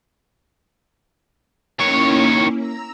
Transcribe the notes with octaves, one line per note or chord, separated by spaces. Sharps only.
D#3 A#3 C#4 E4 C#5
A#5 E6